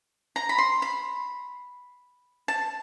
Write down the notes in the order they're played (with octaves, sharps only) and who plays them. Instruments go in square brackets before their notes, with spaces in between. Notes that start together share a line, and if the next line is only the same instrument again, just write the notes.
[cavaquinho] A#5
B5
C6
B5
A5